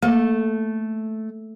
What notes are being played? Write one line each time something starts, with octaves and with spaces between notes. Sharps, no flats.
A3 A#3